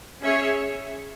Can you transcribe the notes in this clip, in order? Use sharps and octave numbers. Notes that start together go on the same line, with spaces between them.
C#4 G#4 C#5 E5